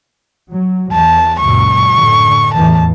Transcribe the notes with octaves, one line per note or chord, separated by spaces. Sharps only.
F#3
E2 A5
C#2 F#2 A#2 C#6
F#2 A2 D3
E2 A2 E3 A5